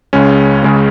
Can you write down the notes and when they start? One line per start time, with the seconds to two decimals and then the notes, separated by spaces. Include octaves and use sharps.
0.13 C#2 C#3 G#3 C#4
0.63 C#3 G#3 C#4